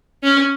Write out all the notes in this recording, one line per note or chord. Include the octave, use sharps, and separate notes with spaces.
C#4